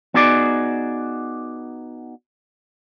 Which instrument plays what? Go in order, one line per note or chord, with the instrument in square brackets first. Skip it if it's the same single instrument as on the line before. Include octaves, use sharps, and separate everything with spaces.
[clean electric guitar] B3 D#4 F#4 G#4 D5